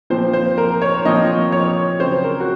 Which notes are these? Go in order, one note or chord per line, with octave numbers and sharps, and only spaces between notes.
A#2 F3 C4 C5
C5
A#4
C#5
A#2 F3 C4 D#5
C#5
C#3 F#3 C4 C5
A#4
F#4